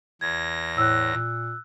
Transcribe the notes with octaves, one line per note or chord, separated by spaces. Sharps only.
E2 G#6 A#6
A2 E6 F#6
A#2